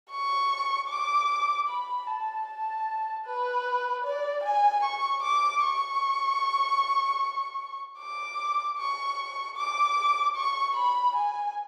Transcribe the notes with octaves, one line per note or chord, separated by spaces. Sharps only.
C#6
D6
B5
A5
A5
B4
D5
G#5
C#6
D6
C#6
D6
C#6
D6
C#6
B5
G#5